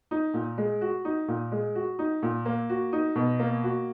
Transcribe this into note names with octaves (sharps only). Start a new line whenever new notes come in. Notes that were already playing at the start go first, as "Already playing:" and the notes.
D#4
A#2
G#3
F#4
D#4
A#2
G#3
F#4
D#4
A#2
A#3
F#4
D#4
B2
A#3
F#4